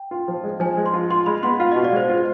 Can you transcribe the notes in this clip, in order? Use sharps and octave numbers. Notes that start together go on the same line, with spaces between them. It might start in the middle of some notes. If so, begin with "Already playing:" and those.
Already playing: G5
F4
F3
G#3
F3 G#5
G#3
C6
F4
F4 C6
G#3 B5
B3 C6
F4 F5
B2 D#5
D5
G#3 C5
F4